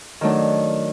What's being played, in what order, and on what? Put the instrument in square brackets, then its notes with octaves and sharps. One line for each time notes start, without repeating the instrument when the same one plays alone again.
[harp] D#3 F#3 A3 D4